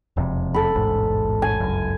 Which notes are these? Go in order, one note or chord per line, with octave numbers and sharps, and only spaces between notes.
E1 F2 C3
A4 B5
E1 A1 G#2
G#5
G1 C#2 F#2